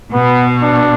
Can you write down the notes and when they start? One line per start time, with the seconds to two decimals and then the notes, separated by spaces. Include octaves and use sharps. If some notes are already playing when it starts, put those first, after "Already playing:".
0.13 B2 B3
0.62 D4